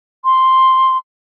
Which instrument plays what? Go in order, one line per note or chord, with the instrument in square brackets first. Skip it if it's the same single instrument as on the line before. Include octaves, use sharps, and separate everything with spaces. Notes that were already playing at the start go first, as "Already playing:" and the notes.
[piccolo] C6